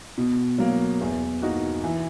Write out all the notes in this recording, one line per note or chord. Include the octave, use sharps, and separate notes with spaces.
B2
F#3 A#3
E2
B2 A#3 D#4 F#4
E3